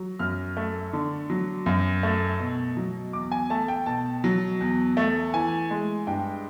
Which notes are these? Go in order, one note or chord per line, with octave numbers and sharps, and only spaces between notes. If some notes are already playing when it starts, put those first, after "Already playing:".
Already playing: F#3
F#2 F6
A3
D3
F#3
F#2
A3
B2
F#3
E2 D6
G#5
A3 A5
G5
B2 A5
F#3
E2
A3
E3 G#5
G#3
G2 G5